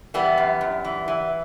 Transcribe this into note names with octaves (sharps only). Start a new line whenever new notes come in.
E3 G3 B3
F#2
F#2
E3
E3